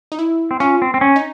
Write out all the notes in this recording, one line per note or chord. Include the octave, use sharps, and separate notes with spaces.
D#4
E4
C4
C#4 F4
C4
C4
C#4
D#4